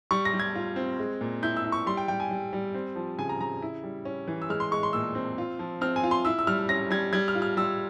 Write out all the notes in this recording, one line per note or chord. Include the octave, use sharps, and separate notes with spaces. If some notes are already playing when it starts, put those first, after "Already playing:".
G3 C#6
A#6
G3
G#6
F4
C4
G#3
A#2
E4 G6
E6
E4
C#6
G3 C6
G5
G3 G5
G#5
G3
G3
C4
F3
C#3 G#5
A#5
C#3 A#5
E4
G3
C#4
E3
E6
G#3 F6
C6
G#3 C#6
C6
A#2 E6
C4
F4
F3
C4 F6
G#5
F4
C6
E4 E6
E6
G3 F6
C#4 A#6
G3 G#6
G3 G#6
F6
F4
F6
G3 E6